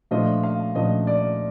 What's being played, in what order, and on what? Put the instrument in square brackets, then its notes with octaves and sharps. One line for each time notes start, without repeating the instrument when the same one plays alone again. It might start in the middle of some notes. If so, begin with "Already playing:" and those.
[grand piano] A#2 F3 A3 D4 F4 D#5
F5
A#2 F3 A3 D4 F4 D#5
D5